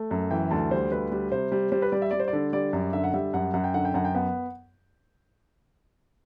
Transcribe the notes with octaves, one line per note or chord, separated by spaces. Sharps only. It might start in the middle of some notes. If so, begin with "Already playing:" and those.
Already playing: A3
F#2
E3 G5
D2 A5
G3 C5
D2 B4
G3
C3 C5
G3
G3 C5
B4
G3 D5
E5
G3 D5
C5
D5
D3
G3 D5
F#2
D3 E5
F#5
G3 E5
F#2 F#5
F#2 F#5
G5
D3 F#5
G5
F#2 F#5
G5
B3 F#5